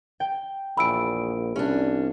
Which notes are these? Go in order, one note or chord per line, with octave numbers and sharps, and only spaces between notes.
G5
A#1 E2 B5 E6 D7
C2 C#4 D4